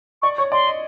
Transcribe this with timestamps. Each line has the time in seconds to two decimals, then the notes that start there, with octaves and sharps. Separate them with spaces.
0.22 D5 C#6
0.38 C#5 C#6
0.52 D5 C6
0.67 D#5